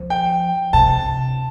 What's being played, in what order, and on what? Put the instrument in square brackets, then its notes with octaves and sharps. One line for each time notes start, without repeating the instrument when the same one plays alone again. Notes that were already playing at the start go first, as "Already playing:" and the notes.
Already playing: [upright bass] F3
[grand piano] G5
[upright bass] C3 [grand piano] A5